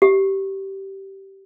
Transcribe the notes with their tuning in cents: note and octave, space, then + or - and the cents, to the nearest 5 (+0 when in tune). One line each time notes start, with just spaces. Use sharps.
G4 -15